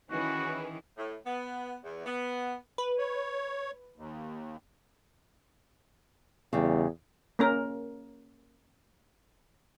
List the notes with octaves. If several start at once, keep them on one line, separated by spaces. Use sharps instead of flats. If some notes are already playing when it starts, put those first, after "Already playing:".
D#3 E3 C#4 F#4 G#4 B4
A2
B3
E2
B3
B4
C#5
D#2
E2 C#3 G3
A#3 C#4 A#4